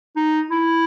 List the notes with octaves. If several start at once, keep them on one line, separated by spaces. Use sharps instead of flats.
D#4
E4